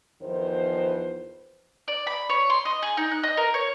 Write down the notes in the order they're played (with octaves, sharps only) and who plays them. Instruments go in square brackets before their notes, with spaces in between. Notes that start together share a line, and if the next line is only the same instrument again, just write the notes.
[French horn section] E2 D#3 F3 B4 C5
[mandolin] D5
B5
C#5
C6
D#5
G#4
D#4
F#6
D#5
A#4
C#5